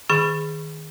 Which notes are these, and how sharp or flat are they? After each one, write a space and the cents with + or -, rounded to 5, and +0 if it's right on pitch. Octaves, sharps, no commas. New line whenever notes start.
D#3 +0 G#4 +0 B5 +0